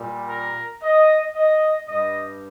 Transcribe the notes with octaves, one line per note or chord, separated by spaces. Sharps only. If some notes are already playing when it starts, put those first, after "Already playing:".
Already playing: A#2 G3
A#4
D#5
D#5
G2 G3 D#5